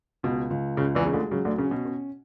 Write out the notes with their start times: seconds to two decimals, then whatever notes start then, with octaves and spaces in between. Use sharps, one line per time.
0.23 C#2 B2
0.50 C#2
0.77 C#2 C#3
0.95 E2 E3
1.05 C#3 G#3
1.13 D2 D3
1.31 C#3 F#3
1.45 D2 D3
1.58 C#3 C#4
1.71 B2
1.85 C#4